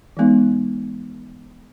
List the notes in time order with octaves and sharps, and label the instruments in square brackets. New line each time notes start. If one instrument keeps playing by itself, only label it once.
[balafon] E3 G#3 B3 D#4